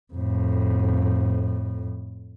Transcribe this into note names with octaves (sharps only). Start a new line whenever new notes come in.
F2 A2